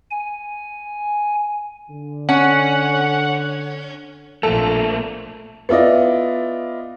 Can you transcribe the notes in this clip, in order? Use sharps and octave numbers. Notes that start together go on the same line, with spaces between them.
G#5
D3
C#4 F#5
A#1 F3 A3 A#3 A4
B3 E4 F4 D5 D#5